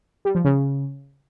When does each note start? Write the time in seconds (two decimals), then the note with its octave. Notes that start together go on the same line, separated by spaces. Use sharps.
0.25 G3
0.35 F3
0.45 C#3